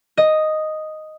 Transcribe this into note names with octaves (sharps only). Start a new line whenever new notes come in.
D#5